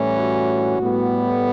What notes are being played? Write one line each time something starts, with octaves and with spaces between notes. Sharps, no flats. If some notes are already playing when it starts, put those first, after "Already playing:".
Already playing: A2 E3 G3 C#4
F#4
A2 G3 B3